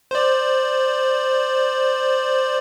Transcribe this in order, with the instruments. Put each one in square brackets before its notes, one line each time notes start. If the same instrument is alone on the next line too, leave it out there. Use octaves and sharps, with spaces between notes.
[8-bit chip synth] C5 D5